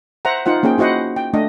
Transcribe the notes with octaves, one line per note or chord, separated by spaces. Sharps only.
C5 E5 F#5 A#5
D#4 F4 C5 F#5
A#3 C#4 G#4 C5 G5
E4 F#4 C5 D#5 F#5
G5
A3 D4 D#5